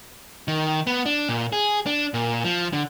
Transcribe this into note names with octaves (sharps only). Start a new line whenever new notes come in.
D#3
B3
D4
A#2
G#4
D4
A#2
F3
D3